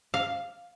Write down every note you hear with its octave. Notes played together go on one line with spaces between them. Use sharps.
F5